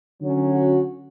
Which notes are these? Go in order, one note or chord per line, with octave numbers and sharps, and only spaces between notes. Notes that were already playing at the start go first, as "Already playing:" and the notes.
D3 F#3 C#4
F#4